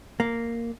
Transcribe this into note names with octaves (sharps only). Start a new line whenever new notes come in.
A#3